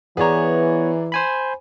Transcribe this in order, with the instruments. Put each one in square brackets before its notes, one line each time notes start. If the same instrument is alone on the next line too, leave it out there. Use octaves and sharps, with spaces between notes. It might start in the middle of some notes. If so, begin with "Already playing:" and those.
[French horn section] E3 [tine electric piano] B3 C#5 [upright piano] G#4 D5 A#5
[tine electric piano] C5 G#5 B5